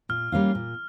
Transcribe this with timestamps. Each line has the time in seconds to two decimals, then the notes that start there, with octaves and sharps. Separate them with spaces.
0.09 A#2 F6
0.32 G3 A#3 C#4 F4
0.55 A#2